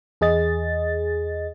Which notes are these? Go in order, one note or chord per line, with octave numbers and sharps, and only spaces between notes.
E2 G#4 D#5 A6